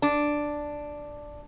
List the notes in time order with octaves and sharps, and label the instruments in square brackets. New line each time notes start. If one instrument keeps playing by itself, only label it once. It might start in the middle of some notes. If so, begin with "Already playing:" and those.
[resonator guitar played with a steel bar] D4